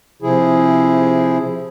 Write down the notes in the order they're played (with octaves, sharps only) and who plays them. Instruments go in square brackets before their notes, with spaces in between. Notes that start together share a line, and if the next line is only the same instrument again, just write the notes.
[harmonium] C3 F3 E4 G#4